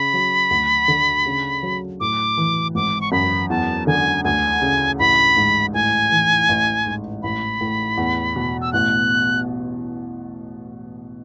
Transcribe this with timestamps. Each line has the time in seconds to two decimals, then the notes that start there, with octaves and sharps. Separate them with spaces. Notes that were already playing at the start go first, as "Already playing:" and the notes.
Already playing: C#3 B5
0.13 F#3
0.51 D2
0.88 D3
1.26 C#3
1.63 F#3
2.00 A2 D6
2.37 E3
2.75 G#1 D6
3.01 C#6
3.12 F#2 B5
3.50 E2 A5
3.87 D3 G#5
4.24 D2 G#5
4.62 C#3
4.99 A1 B5
5.37 G#2
5.74 A2 G#5
6.11 E3
6.49 A1
6.86 G#2
7.23 A1 B5
7.61 A2
7.97 E2
8.36 B2
8.61 E6
8.73 A1 F#6